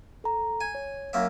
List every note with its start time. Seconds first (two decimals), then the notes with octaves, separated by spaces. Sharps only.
0.24 A4 A#5
0.61 G#5
0.75 C#5
1.13 F#2 A#3 E5